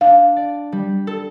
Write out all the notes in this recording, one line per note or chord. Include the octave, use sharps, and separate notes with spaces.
D4 F5
D5
G3
A4